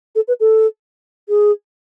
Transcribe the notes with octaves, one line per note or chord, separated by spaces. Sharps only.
A4
B4
A4
G#4